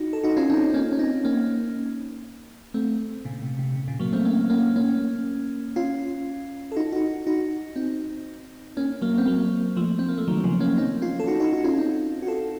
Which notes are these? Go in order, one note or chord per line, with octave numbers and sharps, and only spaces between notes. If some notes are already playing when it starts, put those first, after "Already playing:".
Already playing: D#4 F#4
A4
D#4 F#4
C#4 F4
C4 D#4
C4
A#3 C#4
C#4
C4 D#4
A#3 C#4
A3 C4
A#2 C#3
C3
C3
C3
A#2 C#3
F#3 A#3
A3 C4
A#3 C#4
A#3 C#4
A#3 C#4
C#4 F4
A4
D#4 F#4
D#4 F#4
D#4 F#4
C4 D#4
A#3 C#4
F#3 A#3
C4
F#3 A#3
F3 A3
C4
A#3
A3
D#3 F#3
C#3 F3
A#3 C#4
C4 D#4
C#4 F4
A4
D#4 F#4
D#4 F#4
D#4 F#4
C#4 F4
C4 D#4
F#4
F4 A4